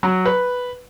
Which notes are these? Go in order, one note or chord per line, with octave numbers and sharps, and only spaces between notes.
F#3
B4